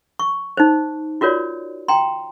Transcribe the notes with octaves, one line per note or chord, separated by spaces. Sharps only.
C#6
D#4 C5
F4 F#4 A#4 C#5 D5
G5 A#5 C6